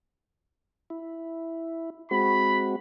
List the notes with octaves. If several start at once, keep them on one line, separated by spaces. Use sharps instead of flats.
E4
G#3 C4 F#4 B5